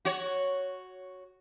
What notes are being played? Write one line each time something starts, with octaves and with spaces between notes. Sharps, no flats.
F#4 C#5